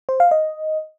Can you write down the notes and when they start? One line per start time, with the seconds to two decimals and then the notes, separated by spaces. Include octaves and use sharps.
0.09 C5
0.20 F5
0.31 D#5